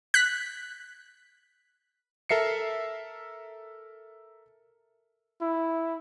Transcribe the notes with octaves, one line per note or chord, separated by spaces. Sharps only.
F#6 B6
A4 A#4 E5 C7 C#7
E4